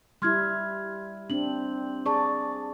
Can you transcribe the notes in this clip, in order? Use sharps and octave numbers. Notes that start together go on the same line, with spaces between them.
G3 E4 C6 F6 G#6
C4 D4 F#7
G#4 D5 A5 C#6